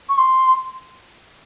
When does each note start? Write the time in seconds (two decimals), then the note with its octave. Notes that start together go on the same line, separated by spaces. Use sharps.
0.09 C#6
0.18 C6